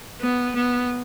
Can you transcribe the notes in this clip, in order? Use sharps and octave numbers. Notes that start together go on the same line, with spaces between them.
B3
B3